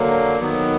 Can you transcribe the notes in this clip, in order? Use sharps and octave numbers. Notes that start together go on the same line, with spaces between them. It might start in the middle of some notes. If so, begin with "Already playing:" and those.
Already playing: D3 F#3 A#3
D#3 F#3 B3